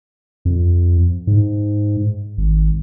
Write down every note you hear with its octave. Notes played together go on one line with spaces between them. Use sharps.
F2
G#2
G#1